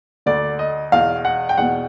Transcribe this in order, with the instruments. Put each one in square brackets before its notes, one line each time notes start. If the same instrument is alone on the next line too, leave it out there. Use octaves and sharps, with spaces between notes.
[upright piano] D2 D3 D5
D#5
E2 B2 F5
F#5
G5
E2 B2 F#5